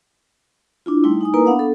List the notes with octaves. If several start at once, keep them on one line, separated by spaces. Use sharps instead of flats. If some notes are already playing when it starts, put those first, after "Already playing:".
D4 E4 F4
G3 A3 D#4 E4 C6 E6
D#4 G#5 D#6
A#3 E4 A#4 B4 A#5
B3 D4 F5 F#5 D#6
A4